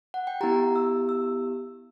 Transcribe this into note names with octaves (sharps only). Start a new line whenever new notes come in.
F#5
G5
B3 E4 G4 A#5
E6
E6